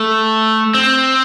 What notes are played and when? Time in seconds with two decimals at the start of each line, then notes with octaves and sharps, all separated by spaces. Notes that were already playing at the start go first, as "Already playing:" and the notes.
Already playing: A3
0.74 C4